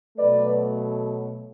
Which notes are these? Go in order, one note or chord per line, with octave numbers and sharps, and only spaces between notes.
B2 F#3 A3 B4 D5